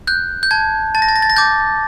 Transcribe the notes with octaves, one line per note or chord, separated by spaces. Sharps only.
F#6 G6
G6
A5 G#6
A5 A6
A#6
A6
A#6
A6
A#6
D6 G6 A6